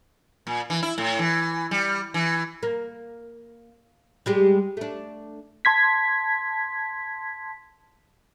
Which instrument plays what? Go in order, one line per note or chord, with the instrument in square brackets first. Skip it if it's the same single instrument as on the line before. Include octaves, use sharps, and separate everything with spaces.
[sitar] A#2
E3
E4
A2
E3
G3
E3
[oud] A#3
G3 G#3 G4
A3 D4
[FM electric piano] A5 C6 G#6 B6